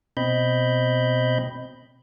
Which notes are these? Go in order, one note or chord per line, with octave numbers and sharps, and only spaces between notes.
B2 C4 D#5 B5 G6